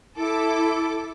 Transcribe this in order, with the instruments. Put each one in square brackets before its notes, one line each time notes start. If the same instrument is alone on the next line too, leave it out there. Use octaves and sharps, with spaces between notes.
[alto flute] E4 [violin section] A4 D6